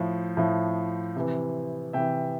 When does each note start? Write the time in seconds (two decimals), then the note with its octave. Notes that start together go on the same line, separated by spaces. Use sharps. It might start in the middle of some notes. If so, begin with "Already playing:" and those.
Already playing: A2 F3
0.37 A2 F3
1.16 C3 E3
1.93 C3 E3 E5 G5